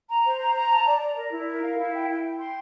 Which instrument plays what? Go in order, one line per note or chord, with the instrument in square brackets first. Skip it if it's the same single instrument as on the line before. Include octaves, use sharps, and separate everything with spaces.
[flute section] A#5
C5
A#5
A#5
A5
D5
D5
A#4
E4
A#4
F5
E4
G5
G5
G5
C6